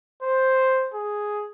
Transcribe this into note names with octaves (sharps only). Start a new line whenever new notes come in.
C5
G#4